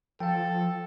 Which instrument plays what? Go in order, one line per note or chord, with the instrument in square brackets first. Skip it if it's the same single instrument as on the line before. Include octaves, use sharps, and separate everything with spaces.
[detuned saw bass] F3 [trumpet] A4 [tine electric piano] F5 G5